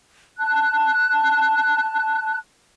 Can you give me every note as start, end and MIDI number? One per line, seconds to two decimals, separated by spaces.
0.39 2.37 81
0.39 2.37 90